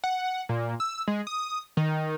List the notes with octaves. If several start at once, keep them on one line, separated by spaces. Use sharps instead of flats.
F#5
A#2
E6
G#3
D#6
D#3